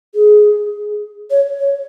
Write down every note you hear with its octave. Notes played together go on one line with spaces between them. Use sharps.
G#4
C#5
C#5